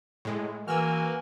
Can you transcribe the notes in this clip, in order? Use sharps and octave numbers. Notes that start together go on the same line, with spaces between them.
A2 G#3
E3 A#3 F#4 G#5 E6 F6